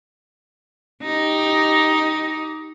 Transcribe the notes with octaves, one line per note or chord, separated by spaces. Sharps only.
D#4 G4